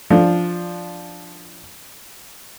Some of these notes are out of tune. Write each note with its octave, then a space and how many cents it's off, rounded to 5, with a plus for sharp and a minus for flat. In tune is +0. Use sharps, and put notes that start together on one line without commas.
F3 +0 D4 +0